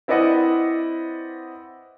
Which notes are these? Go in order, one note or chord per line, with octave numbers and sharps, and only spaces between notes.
C4 E4 B4 D5 D#5 F#5